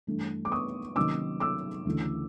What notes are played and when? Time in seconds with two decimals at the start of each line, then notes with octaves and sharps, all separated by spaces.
0.07 G2 E3 A3 D4
0.45 D6
0.52 C#6 D#6
0.96 C3 D#3 F#3 A#3 C#4 D6 E6
1.40 D6 E6
1.85 D2 C#3 E3 A3 D4